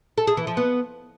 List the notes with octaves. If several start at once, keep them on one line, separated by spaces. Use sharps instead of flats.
A4
G#4
E3
F3
B3